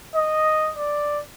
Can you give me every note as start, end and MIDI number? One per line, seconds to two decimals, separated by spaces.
0.16 0.72 75
0.77 1.21 74